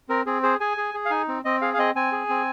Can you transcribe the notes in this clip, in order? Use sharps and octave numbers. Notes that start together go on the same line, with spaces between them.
C4 A#4
C4 G#4
G#4 C5
G#4 G#5
G#4
G#4
F5
D#4 G#5
C4
C4 D#5
G#4 F5
F5
C4 D#5
C4 G#5
G#4
C4